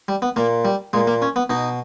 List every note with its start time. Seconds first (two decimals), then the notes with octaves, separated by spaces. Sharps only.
0.08 G3
0.22 B3
0.36 A#2 A#3
0.65 G3
0.93 A#2 G#3
1.07 A#3
1.22 C#4
1.36 B3
1.50 B2 D#4